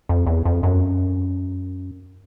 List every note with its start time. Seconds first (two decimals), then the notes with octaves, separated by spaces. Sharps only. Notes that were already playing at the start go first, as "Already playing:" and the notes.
0.09 F2
0.27 E2
0.45 F2
0.63 F#2